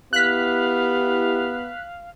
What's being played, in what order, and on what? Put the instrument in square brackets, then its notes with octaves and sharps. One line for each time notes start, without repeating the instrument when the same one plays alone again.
[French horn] B3 [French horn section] E4 G4 [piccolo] F5 [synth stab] F#6 B6